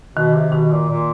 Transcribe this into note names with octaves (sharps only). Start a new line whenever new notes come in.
B2 D#3
C3
B2 D#3
A#2
A#2